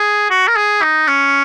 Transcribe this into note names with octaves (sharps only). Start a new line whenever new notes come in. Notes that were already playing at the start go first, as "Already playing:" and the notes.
Already playing: G#4
F#4
A#4
G#4
D#4
C#4